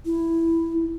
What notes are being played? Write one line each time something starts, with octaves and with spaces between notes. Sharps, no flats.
E4